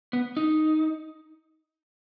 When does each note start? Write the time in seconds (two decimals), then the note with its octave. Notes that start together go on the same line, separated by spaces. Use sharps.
0.13 B3
0.37 D#4